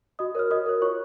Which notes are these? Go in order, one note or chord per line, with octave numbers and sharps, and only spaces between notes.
F#4 D#5 D#6
A#4 C#5 F6
F#4 D#5 D#6
A#4 C#5
F4 C#5 C#6